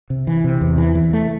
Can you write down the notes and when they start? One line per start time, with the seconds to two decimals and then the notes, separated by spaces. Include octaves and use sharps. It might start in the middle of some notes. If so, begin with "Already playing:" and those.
0.10 C3
0.27 E3
0.44 C3
0.61 E2
0.78 E3
0.95 E3
1.13 A3